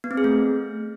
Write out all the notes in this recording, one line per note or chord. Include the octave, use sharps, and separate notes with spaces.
B3
C4
G#4
A3